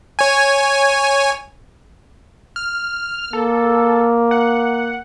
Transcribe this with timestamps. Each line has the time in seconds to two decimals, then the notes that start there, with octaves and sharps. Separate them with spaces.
0.19 C#5 G#5
2.56 F6
3.33 A#3 A4
4.31 F#5